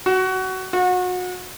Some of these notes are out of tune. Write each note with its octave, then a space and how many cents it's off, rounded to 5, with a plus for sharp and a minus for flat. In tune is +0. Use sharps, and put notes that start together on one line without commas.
F#4 +20
F#4 -30